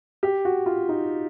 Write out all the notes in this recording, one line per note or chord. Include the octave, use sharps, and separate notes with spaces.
G4
F#4
F4
D#4